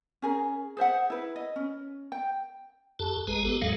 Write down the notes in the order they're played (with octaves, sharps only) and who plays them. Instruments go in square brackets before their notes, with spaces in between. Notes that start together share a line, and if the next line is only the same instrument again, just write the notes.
[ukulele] C#4 G#4 A#4
G#4 C5 E5 F#5
E4 B4
D#5
C#4
G5
[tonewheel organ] F#2 G4 A4 A5
G#1 G#3 G#4 B4 A#5
B3 G4 A4
D#2 G#2 F#3 G#3 A4 F5